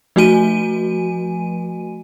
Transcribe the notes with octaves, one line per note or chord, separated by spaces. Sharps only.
F3 A3 F#4 G#5 D#7